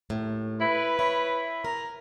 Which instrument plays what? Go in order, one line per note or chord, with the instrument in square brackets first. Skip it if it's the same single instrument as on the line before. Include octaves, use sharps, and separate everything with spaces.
[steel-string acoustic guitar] D#2 A2
[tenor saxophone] E4 [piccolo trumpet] B4
[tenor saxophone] E4 [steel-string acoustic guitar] C#5
[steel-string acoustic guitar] A#4 [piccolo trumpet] A#5